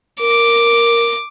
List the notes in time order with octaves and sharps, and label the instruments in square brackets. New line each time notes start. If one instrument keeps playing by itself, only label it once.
[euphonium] A#4 [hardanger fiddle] D6